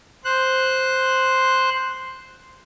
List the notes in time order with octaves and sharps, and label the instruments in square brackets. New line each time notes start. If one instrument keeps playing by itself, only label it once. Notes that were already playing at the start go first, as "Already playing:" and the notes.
[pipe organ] C5 F#6